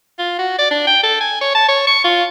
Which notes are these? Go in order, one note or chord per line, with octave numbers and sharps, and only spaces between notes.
F4
F#4
D5
D4
G5
A4
G#5
C#5
A5
C#5
C#6
F4